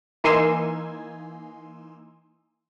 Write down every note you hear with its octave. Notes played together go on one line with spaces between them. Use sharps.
E3 A#3 D#4 G#5 C6 E6